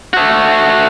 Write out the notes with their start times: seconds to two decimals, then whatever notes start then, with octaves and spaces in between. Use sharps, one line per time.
0.13 A3 F#4